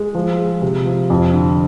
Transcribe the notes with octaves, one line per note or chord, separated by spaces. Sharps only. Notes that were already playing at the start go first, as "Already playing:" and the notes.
Already playing: G#3
F3
G#3
C3
F3
F2
D3